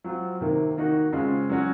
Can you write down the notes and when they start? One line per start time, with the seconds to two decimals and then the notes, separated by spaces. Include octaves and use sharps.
0.04 F#3 C4 F4
0.41 C3 D#3 A#3
0.77 D#3 A#3 D#4 F#4
1.13 C#3 G#3 C4 F4
1.50 F#3 C#4 F#4